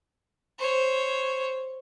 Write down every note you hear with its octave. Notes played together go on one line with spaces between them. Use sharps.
C5 C#5